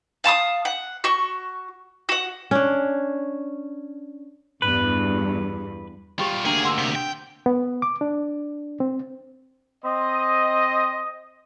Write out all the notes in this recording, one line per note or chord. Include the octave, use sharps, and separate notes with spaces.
F5 A5 C6 D#6
F#5
F#4 C#6
F#4 F#5
C#4 D4
E2 G2 B4
G3 F4 G4 G5
D2 A#3 D4 G#4 G5 A#5
F#5 C6 E6
C3 D#6
G5
B3
D6
D4
C4
C4 D#5